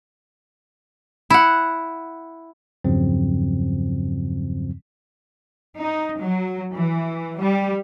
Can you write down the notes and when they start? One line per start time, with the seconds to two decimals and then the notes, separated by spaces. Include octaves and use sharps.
1.30 E4 F#5
2.84 E2 G2 C#3 F3 F#3 C4
5.79 D#4
6.21 F#3
6.75 E3
7.38 G3